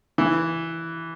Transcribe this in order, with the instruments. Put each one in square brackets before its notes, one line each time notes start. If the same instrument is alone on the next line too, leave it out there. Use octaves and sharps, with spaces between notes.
[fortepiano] E3